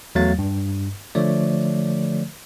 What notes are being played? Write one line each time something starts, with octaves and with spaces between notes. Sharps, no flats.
E2 F#3 A3 F5 A6
G2
D3 F3 A3 C#5 D5